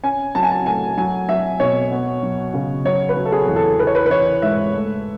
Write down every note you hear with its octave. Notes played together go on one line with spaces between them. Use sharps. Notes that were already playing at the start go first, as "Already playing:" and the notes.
C#4 G#5
F#3 A5
G#5
A5
A3 G#5
F#3 G#5
F#3 E5
B2 C#5
B3
F#3
C#3
F#3 C#5
B4
F#3
A4
G#4
E2
A4
E3 B4
C#5
B4
B4
E3 C#5
G#2 E5
A3